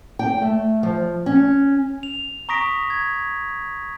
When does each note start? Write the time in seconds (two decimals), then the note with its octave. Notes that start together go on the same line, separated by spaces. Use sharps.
0.19 G5
0.42 A3
0.83 F3
1.26 C#4
2.03 F7
2.49 A#5 C#6 D#6 A#6 B6 D7
2.90 G#6